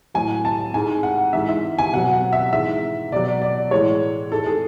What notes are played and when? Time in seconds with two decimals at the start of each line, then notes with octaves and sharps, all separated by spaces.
0.14 A2 F#3 G#5
0.45 A5
0.74 G#2 G#3 G#5
1.03 F#5
1.33 G#2 E3 G#3 E5
1.49 E5
1.79 G#5
1.93 B2 F#3 F#5
2.13 F#5
2.33 E5
2.53 G#2 E3 G#3 E5
3.12 B2 F#3 D5
3.42 D5
3.71 A2 E3 G#3 C#5
4.31 G#2 G#3 A4
4.46 G#4